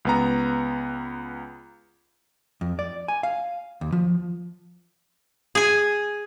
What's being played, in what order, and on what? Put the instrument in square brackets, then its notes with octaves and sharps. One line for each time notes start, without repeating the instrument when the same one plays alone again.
[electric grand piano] C#2 B3 A#5
[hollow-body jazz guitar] F2
D5
G#5
F5
D#2
F3
[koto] G#4 G#5